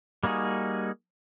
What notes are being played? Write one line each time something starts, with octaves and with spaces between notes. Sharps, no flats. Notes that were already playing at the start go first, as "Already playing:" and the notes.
G3 A#3 D#4 F#4 G#4